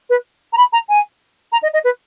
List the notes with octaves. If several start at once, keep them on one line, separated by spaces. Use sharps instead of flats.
B4
A#5
B5
A#5
G#5
A#5
D#5
D#5
B4